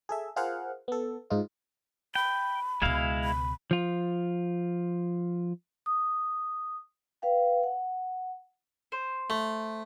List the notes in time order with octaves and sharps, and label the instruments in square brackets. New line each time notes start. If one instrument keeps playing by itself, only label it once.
[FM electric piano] G#4 A4 E5
F4 G#4 A#4 C5 F5 F#5
B3 A4
G#2 D#4 F4
[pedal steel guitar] G5 [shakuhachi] B5
[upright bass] C#2 B2 [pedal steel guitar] G#3 E4 F5
[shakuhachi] B5
[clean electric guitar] F3 F4
[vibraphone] D#6
B4 F5 G5
F#5
[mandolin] C5
[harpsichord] A3